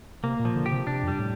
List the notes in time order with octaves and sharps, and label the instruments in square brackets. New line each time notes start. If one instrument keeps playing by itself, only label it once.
[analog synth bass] C3 [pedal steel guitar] A#3
[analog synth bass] A#2
[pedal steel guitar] F3
[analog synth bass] D3
[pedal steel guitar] G4
[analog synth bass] C3
[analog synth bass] C3 [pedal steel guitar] D4
[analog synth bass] F2
[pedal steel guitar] G3
[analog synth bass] A2